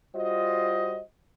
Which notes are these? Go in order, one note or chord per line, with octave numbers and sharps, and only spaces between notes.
G3 F4 F#4 C5 D#5